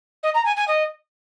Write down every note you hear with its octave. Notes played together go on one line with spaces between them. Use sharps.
D#5
A#5
G#5
G#5
D#5